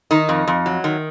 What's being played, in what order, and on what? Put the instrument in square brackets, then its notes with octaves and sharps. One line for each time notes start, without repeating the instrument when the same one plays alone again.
[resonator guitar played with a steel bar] D#3 D#4
F2
F2
F#3
D#3